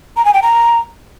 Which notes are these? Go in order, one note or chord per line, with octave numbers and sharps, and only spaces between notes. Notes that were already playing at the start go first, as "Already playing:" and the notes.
A#5
G#5
G5
A#5